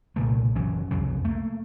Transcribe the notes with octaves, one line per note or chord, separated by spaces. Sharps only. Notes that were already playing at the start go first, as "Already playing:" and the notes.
C2 A#2 C#3 A3
F#1 E3 F#3 C#4
C2 F2 C#3 F#3
A3 A#3